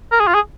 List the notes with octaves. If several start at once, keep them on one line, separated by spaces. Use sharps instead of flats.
A#4
G#4
F4
G#4